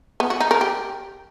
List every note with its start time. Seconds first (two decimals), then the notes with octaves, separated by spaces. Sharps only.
0.20 B3
0.30 F#4
0.40 D#4
0.51 A#4
0.61 G4